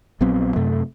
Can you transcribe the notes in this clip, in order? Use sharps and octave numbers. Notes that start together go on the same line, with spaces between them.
A#1 F#3 B3 C4
F#2 C3 A3